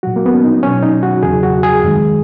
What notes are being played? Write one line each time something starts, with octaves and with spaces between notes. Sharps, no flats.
A#2 F#3 F#4
A#3
B3
C#4
D#4
B2 F#3 C#4
D#4
F#4
E2 C#3 F#3 G#4
F#4
G#4
F#2 D#3 G#3